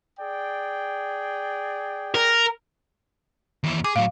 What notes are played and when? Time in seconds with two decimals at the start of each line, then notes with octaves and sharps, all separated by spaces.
0.20 G#4 D5 G5
2.14 A#4
3.64 D#2 E3
3.84 G#4 D6
3.96 A2 F#3 F5